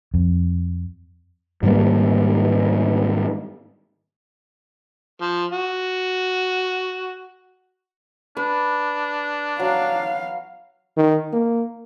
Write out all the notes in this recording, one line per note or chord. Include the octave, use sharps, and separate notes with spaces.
F2
G#2 D#3 G3 A#3
F3
F#4
D4 B4
F#3 F5
D#3
A#3